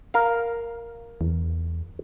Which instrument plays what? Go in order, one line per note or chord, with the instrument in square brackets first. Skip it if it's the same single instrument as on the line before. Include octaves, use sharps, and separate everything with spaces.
[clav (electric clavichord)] A#4 F5
[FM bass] E2